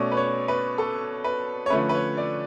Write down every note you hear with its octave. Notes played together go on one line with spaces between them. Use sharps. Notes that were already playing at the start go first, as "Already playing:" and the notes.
Already playing: B2 A3 C#4 D5
B4
C#5
B4
A4
B4
C#5
D3 F3 A3 C#4 B4
B4
C#5
D5